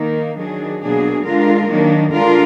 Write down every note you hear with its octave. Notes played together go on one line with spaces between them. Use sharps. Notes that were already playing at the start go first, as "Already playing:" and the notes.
Already playing: D#3 A#3 D#4
D#3 F#3 D4 G#4
B2 F#3 A#3 D4 G#4
D3 G#3 D4 F4 A#4
D#3 F#3 A#3 D4
D3 G#3 D4 F4 A#4